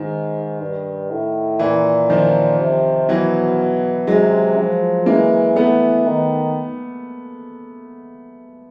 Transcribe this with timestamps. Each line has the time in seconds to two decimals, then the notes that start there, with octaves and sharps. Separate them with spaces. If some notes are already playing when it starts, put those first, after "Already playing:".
Already playing: G#2 D#3
0.60 G2
1.10 A2
1.59 A#2 E3
2.10 D#3 F3
2.60 C3
3.09 B2 E3 F#3
4.07 C3 F#3 G#3
4.57 F3
5.06 E3 G#3 A#3
5.56 E3 A3 B3
6.06 D#3